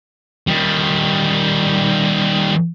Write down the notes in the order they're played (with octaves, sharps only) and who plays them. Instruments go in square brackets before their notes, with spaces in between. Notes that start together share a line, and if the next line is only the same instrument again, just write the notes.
[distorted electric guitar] D#3 G3